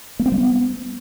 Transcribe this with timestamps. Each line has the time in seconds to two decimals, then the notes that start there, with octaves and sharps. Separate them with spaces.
0.19 A#3
0.26 C4
0.32 G3
0.38 B3